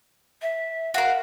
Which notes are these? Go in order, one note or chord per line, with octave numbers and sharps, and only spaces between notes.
E5
F#4 A#4 F5